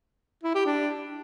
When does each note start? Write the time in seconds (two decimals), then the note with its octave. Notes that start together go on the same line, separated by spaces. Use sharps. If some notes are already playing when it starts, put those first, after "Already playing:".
0.44 E4
0.55 G4
0.66 D4